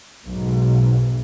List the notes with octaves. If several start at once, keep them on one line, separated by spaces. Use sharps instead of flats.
B1 G#2